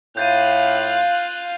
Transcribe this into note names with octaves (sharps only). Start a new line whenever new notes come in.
A2 F4 F5 F#6 G6 A6 D#7